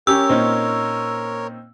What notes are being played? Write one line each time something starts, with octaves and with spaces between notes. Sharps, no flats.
C#4 G4 A#4 C#5 E6
A#2 A#3 C4 C#4 D#4